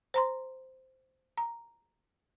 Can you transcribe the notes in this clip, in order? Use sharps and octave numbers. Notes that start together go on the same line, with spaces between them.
C5 A#5 C6
A#5